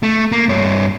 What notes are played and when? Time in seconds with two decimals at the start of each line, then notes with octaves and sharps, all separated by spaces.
0.03 A3
0.32 A#3
0.49 G2 C#5